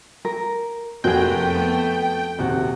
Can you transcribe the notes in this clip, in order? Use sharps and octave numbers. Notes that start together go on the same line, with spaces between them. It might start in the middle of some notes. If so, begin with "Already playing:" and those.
A#4
F1 F2 A3 A#3 F#4 G#4 G5 G#5
B3
D#1 C3 F#4